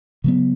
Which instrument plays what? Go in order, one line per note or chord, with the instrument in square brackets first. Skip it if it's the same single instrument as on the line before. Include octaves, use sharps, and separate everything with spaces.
[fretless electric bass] C#3 F#3 B3